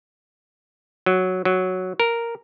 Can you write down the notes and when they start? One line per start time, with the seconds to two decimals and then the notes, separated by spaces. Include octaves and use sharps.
1.06 F#3
1.45 F#3
2.00 A#4